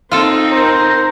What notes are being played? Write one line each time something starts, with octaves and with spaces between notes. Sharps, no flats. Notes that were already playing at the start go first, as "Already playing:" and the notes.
C4 D#4 F4 A4
A#4 C5